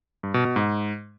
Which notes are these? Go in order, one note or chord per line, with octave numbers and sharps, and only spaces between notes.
G2
B2
B2
G#2